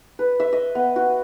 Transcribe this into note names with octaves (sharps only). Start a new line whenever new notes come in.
B4
E5
D#5
B3
F#4